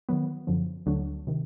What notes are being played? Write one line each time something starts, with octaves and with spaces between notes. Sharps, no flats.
D#3 F#3 B3
F#2 D3 F3
D2 D3 F#3 A3 D4
C3 D#3